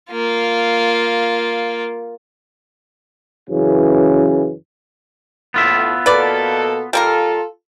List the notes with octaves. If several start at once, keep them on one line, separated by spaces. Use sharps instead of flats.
A#3 F4
F#2 C#3 E3
A2 B3 F4 E5
B2 A#3 A4 B4 D5
G3 A#3 F4 A4 A#4